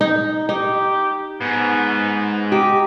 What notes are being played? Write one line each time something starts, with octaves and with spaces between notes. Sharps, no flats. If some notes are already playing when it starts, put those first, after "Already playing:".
D#4
D#4 G4
G#2 B3
D#4 G4